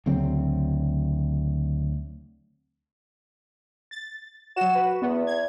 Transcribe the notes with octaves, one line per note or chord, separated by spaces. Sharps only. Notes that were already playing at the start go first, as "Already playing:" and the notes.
D2 C#3 F#3 C4
A6
F#3 F#4 E7
B4
E2 B3
G#6